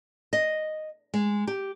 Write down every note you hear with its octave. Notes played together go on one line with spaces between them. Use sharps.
D#5
G#3
G4